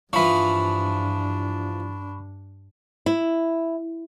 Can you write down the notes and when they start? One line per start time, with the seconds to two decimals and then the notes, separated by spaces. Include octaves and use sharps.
0.13 G2 E3 F3 D4 B5 C#6
3.06 E4